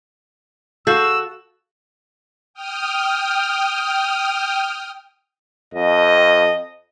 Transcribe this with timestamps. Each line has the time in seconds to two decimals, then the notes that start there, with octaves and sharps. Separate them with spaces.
0.87 F#4 A4 F5 E6 G6 C7
2.54 G5 D#6 F6
5.74 F2 D#5